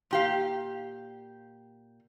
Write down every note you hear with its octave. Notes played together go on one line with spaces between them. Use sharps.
A#2 G4 F5